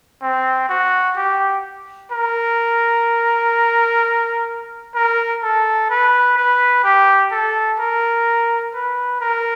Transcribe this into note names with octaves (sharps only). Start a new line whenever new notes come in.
C4
F#4
G4
A#4
A#4
A4
B4
B4
G4
A4
A#4
B4
A#4